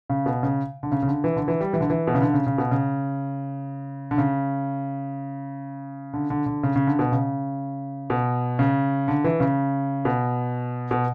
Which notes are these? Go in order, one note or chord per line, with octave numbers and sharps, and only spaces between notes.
C#3
B2
C#3
D3
C#3
C#3
D3
E3
D3
E3
G3
E3
D3
E3
B2
C#3
D3
C#3
C#3
B2
C#3
D3
C#3
D3
D3
D3
C#3
C#3
D3
B2
C#3
B2
C#3
D3
E3
C#3
B2
B2